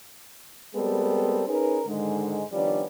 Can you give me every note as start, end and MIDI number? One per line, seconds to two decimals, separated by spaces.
0.75 1.43 55
0.75 1.43 56
0.75 1.43 59
0.75 1.43 60
0.75 1.43 69
0.75 1.43 70
1.48 1.81 61
1.48 1.81 63
1.48 1.81 68
1.48 1.81 70
1.48 1.81 71
1.87 2.42 44
1.87 2.42 50
1.87 2.42 51
1.87 2.42 56
2.53 2.83 51
2.53 2.83 53
2.53 2.83 55
2.53 2.83 59
2.53 2.83 61
2.53 2.83 62